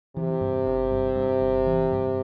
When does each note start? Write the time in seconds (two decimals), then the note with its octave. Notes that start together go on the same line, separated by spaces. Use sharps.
0.16 C3 E3
0.41 G2
0.67 G1
0.91 G2
1.16 G2
1.41 G1
1.66 E3
1.92 G2